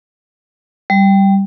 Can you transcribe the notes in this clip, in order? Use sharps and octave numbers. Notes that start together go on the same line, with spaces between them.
G3